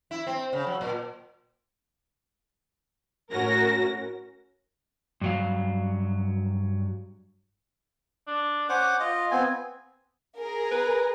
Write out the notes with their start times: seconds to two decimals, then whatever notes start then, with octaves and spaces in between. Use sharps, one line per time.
0.11 E4
0.27 C4
0.53 C#3
0.67 F#3
0.81 A#2
3.32 A2 C#4 F#4 A#4 A#6
5.21 G2 F#3 F5
8.27 D4
8.69 C#4 C5 F#5 D6
9.00 F4 D#5
9.31 B3 C4 G#5
10.39 G#4 A#4
10.71 B4